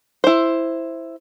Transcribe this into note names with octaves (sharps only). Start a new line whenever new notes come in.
E4 C5